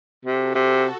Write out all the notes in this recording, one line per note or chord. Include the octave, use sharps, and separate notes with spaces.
C3 F#4 A4
C3